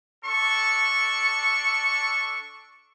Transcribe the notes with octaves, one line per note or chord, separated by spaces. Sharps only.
D4 A4 C#6